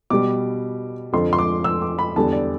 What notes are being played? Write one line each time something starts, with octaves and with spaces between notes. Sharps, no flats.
B2 G3 D6
F2 D3 F3 C6
C6
D6
E6
D6
B5
E2 D3 G3 A5
D5